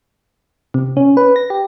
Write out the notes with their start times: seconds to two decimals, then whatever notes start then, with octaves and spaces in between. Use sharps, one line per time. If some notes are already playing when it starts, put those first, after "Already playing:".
0.74 C3
0.97 C#4
1.17 B4
1.36 A#6
1.50 G4